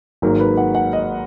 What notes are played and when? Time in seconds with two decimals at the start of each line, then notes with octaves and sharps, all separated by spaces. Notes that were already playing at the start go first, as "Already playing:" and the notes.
0.22 G#1 G#2 F#3 A#3 A#4
0.40 B4
0.57 F#5
0.75 F#5
0.93 D#5